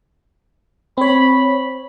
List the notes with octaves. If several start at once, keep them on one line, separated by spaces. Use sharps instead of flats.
C4 C#5 B5